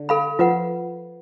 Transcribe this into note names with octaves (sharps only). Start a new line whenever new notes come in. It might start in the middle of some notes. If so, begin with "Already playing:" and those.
Already playing: D3
A4 F5 B5
F3 F4 B4 F#5